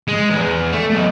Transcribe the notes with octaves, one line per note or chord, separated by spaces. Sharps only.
G#3
E2
A3
B1